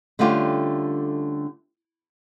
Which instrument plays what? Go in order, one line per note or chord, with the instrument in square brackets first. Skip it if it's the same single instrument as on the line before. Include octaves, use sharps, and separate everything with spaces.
[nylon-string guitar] D3 G3 A3 C#4 F4 G4